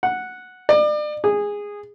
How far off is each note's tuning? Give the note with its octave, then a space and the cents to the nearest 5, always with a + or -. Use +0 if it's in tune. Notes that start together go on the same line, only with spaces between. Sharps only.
F#5 -5
D5 +35
G#4 -15